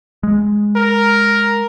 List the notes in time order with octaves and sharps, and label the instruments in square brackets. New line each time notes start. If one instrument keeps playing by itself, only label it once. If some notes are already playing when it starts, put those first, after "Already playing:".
[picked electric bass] G#3
[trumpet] A#4